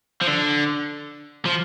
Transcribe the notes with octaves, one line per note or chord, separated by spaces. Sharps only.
F3
D3
F3